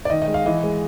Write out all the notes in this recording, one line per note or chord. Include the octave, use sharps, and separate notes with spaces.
D5
D#3 D#5
D#5
G#3
F5
E3 D#5
G#3